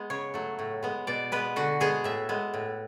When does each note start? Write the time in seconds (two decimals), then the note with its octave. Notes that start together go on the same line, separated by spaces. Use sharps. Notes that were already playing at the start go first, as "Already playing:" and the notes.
Already playing: G#3 B3
0.10 C#3 C#5
0.34 F#3 A3
0.59 A2
0.83 G#3 B3
1.07 B2 D5
1.32 G#3 B3 B4
1.56 D3 F#4
1.80 G#3 B3 G#4
2.04 A2 E5
2.29 G#3 B3
2.54 A2